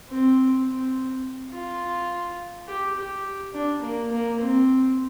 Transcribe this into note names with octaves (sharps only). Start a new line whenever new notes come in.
C4
C4
F4
G4
G4
D4
A#3
A#3
C4